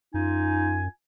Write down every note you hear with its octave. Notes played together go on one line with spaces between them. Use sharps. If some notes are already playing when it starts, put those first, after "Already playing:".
F#2 D#4 F4 G#5